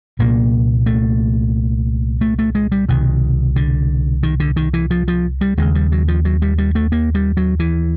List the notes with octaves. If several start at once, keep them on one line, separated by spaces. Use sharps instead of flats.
C2 A#2 A#3
A3
A3
A3
G#3
G3
C2 B2 D#3
D3
D#3
D3
D#3
E3
F3
F3
G3
D#2 C#3 G#3
G3
F#3
F3
F#3
G3
G3
A3
A#3
G3
F#3
E3